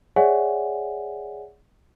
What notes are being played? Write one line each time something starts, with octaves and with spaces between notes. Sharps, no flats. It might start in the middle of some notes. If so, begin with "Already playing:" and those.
G#4 C#5 D5 E5 F#5 G#5